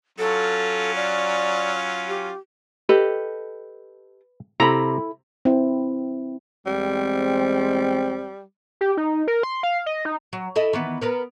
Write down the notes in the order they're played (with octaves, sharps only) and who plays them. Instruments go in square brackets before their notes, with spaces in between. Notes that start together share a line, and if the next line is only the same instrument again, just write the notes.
[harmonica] F#3 C#4 F4 [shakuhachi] A4
[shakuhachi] D5
G4
[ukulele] G4 A4 D#5 [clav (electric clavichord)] B4
[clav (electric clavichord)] C3 A#5 [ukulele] E4 A4 B5
[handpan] C4 E4
[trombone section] E2 G#3 C4 [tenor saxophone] G3
[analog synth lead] G4
D#4
A#4
C6
F5
D#5
D#4
[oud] F#3
E4 A4 D#5
D#3 E3 B3
B3 A#4 B4